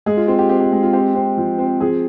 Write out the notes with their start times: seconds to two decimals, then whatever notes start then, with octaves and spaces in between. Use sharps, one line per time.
0.06 G#3 G#4
0.17 F4
0.27 C4 F4
0.39 G4
0.49 C4 G4
0.61 G4
0.72 G#3
0.83 F4
0.93 C4 G4
1.15 C4
1.37 F3
1.58 C4
1.80 F3 G#4